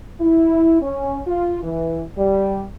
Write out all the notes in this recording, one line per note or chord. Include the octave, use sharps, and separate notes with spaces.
E4
C#4
F4
E3
G3